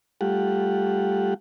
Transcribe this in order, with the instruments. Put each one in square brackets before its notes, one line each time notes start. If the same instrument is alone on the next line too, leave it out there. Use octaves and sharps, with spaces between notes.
[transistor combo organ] G3 A3 F4 G4 F#5